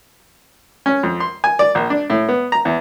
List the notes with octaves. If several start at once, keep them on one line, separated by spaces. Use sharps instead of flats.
C#4
F2
C6
G#5
D5
A#1
D4
A2
B3
A#5
E2